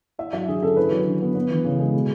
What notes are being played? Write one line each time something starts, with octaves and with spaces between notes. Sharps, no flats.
E4 E5
F#3 E5
D3 G#4
C#4 A4
E4 B4
F#3
D3
B3
B3
E3
C#3
G#3
B2